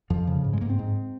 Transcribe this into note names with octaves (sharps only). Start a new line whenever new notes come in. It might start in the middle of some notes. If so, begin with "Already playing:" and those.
F2 F3
C#3
G#2
G#3
G#2 A#3
C4
G#2